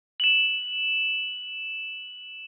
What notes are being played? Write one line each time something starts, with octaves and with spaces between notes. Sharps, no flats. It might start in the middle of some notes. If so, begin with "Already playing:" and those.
E7 F#7